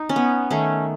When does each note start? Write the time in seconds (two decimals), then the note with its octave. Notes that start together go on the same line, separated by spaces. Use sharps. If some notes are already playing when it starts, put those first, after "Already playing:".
Already playing: D#4
0.09 C#4
0.16 B3
0.50 D#3 A3 C#4